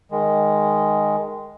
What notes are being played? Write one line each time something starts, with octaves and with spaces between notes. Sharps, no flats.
D#3 G#3